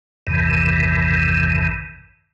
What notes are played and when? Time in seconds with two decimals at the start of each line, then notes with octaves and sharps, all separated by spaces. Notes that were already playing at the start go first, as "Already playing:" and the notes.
0.27 A1 E2 G2 C3 D#3 E3